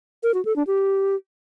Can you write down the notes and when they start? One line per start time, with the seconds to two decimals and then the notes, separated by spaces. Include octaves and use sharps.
0.23 A#4
0.34 F#4
0.45 A4
0.56 D4
0.67 G4